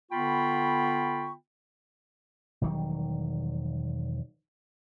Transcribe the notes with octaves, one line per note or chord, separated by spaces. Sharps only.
D3 B3 F4 G5 B5 C#6
E1 D#3 F#3 G3